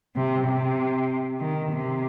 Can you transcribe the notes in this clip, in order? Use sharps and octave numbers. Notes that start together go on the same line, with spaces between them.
C3
C3
D#3
C3